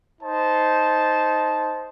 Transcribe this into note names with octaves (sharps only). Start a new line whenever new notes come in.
D#4 C5 A5